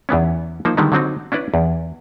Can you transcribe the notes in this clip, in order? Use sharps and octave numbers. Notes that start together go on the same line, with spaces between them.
E2 E3 B3 C#4
F3 A#3 D#4 C5
D3 D#3 G3 G#3 B3
D3 F#3 C4 D#4
C#4 D4 E4 B4 D5
E2